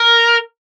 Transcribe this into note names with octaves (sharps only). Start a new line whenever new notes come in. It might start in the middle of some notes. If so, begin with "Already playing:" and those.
Already playing: A#4